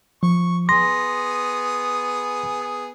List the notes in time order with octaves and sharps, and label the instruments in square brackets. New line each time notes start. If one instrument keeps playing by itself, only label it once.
[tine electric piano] F3 [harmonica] C#6
[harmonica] B3 G#4 D#6 [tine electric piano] C6 A#6